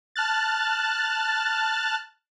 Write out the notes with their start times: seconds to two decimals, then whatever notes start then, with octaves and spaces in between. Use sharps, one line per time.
0.16 A5 F6 F#6 A6